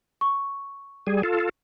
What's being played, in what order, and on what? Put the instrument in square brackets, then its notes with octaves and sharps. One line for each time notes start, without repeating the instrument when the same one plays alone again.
[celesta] C#6
[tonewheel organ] G3 G#4
F4 A4